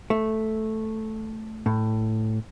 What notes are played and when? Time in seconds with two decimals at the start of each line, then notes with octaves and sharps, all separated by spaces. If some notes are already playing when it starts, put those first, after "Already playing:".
0.10 A3
1.66 A2